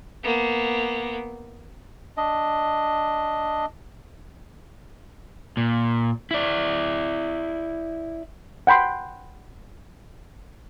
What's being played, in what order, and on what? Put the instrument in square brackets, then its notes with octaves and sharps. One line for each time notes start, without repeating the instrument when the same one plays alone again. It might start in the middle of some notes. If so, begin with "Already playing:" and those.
[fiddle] A#3 B3
[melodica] D4 D#5
[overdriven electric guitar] A#2
E4 D5
[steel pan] F#5 G5 B5 C6